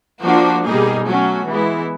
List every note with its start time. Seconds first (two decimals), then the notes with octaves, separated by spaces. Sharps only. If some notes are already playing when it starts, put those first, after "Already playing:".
0.23 F3 A#3 D4 F#4
0.64 B2 G3 A#3 D#4 G#4
1.06 F#3 A3 C#4 F#4
1.47 E3 G#3 B3 E4